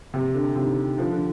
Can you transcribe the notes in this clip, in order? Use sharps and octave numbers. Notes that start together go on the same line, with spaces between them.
C3
D3
C3 D#3
D3 F3
D3